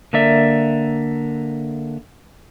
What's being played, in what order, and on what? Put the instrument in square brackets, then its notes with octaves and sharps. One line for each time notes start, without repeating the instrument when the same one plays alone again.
[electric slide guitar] D3 A#3 A#4 D5 E5